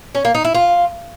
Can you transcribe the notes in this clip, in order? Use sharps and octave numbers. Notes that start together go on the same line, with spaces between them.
C#4
A#3
D#4
E4
F4